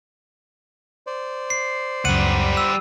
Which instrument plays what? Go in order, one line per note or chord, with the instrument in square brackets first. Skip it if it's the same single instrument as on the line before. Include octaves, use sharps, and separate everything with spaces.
[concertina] C5 D5
[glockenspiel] C7
[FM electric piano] C#2 F#2 [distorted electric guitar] G3 F#5 [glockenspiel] D#7
[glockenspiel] E6